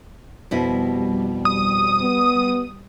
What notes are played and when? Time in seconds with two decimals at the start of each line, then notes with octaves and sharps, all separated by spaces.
0.51 F2 B2 G3 E4
1.45 D#6
2.01 B3